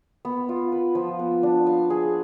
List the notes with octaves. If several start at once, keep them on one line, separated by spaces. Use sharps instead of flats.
B3
F4
B4
F3
B3
D4
F5
G#4